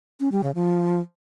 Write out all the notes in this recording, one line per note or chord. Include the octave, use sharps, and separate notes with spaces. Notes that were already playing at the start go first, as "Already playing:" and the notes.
C#4
G3
C#3
F3